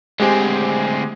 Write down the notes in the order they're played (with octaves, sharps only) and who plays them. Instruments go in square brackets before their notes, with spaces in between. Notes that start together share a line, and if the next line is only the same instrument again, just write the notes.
[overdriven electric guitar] D2 C4 [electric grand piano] G#3 G4 G#5